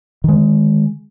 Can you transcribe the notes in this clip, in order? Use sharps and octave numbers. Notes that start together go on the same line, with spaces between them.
D3 D#3 G#3